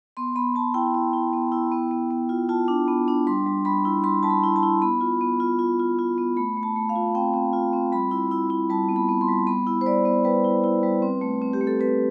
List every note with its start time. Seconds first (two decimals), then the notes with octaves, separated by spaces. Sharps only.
0.17 B3 C6
0.36 B3 B5
0.55 B3 A5
0.74 E4 G5
0.95 E4
1.13 E4
1.33 B3
1.52 E4
1.72 B3
1.91 B3
2.11 B3
2.29 F4
2.49 F4 A5
2.68 D4
2.88 B3
3.08 D4
3.27 G3 C6
3.46 G3
3.65 G3 B5
3.85 E4
4.04 G3 C6
4.23 G3 A5
4.30 B5
4.43 E4
4.56 A5
4.63 E4
4.82 B3 B5
5.01 F4
5.21 B3
5.40 F4
5.59 F4
5.80 F4
5.99 F4
6.18 B3
6.37 A3 B5
6.57 A3
6.63 A5
6.76 A3
6.89 F5
6.96 F4
7.15 C4 G5
7.34 C4
7.53 F4
7.73 C4
7.92 G3 B5
8.11 E4
8.31 E4
8.50 E4
8.70 G3 A5
8.89 B3
8.96 B5
9.08 B3
9.21 C6
9.28 G3
9.47 B3 B5
9.67 E4
9.81 C5
9.86 G3 D5
10.05 B3
10.24 G3 B4
10.44 E4
10.64 E4
10.83 G3
11.02 C4
11.21 A3
11.42 C4
11.53 G4
11.61 A3
11.67 A4
11.80 C4 B4